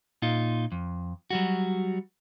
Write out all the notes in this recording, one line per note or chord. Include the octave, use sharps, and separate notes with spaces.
A#2 D#4 F4
F2
F#3 G3 F#4